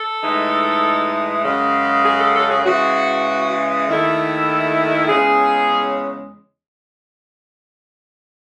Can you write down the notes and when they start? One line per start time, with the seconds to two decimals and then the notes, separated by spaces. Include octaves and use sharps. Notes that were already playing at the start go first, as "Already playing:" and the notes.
Already playing: A4
0.23 A2 E3 G#3 D#4
1.44 F#2 C#3 G#3
2.05 G#4
2.20 A4
2.36 A4
2.51 G#4
2.66 C#3 E3 G#3 F#4
3.88 D#2 D#3 A3 E4
5.09 E2 C#3 G#3 C#4 G#4